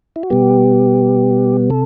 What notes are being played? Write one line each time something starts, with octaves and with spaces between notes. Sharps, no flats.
E4
F#4
B2 G3 B3 G4
C3 A4